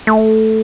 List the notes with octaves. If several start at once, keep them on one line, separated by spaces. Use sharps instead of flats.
A3